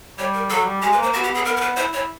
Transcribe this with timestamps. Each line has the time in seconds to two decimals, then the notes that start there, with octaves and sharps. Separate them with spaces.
0.18 G3 C#5
0.34 A#4
0.50 F#3 A4
0.65 G3
0.81 G#3 G4
0.92 B4
0.97 A#3 C5
1.13 B3 F#4
1.23 G4
1.29 B3
1.35 G#4
1.45 B3 A#4
1.57 A#4
1.61 B4
1.76 E4 C5
1.93 E4 C#5